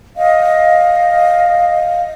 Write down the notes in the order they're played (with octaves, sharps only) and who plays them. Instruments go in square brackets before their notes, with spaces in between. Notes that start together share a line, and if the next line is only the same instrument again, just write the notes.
[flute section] D#5 F5